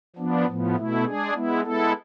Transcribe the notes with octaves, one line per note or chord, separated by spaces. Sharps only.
F3 B3 D4
A2 F3 B3
B2 A3 E4
G#3 D4 G#4
G#3 B3 E4
G#3 B3 E4 A4